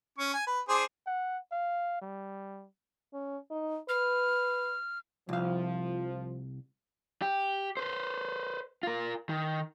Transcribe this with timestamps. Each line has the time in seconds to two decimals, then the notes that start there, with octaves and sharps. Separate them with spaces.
0.18 C#4 C#6
0.34 G#5
0.47 B4
0.69 D4 G#4 C5
1.07 F#5
1.51 F5
2.02 G3
3.13 C#4
3.51 D#4
3.89 B4 F6
5.29 C2 F3 F5
7.22 G4
7.77 B4 C5
8.83 F4 A#4
9.29 D#3